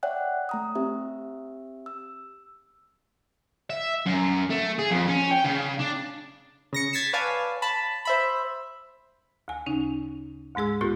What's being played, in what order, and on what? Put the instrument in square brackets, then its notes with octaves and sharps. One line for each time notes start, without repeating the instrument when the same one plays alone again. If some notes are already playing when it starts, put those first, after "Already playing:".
[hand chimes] C#5 D5 E5 F#5 G5 F#6
A3 A#5 D#6
C4 G4 E5
E6
[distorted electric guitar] E5
F#2
A3
G#4
F2
C#4
G5
C#3
D4
[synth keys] C#3 A#6 C#7
G#6 A6 B6 C7 E7
B4 C#5 D5 F5 G#5 A5
A5 B5
C5 E5 B5
[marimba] D2 G#5
C#3 C#4 D#4
D2 G#2 G#3 G#4 E6
A2 B3 F4 G4 A4 F#6